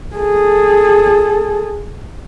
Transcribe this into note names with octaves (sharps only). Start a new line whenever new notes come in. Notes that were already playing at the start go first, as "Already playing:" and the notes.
G#4 A4